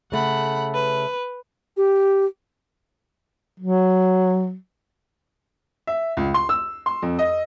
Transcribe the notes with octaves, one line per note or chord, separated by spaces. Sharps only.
C#3 A3 F#5 B5
B4
G4
F#3
E5
C#2
C6
E6
C6
F2
D#5